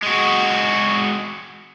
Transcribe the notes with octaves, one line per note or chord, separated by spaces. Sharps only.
G#3 F#4